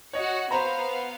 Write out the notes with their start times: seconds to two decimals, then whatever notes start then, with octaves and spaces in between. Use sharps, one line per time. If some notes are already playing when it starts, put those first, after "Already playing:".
0.13 F#4 C#5 D#5 F#5
0.51 B3 C5 F5 A#5 B5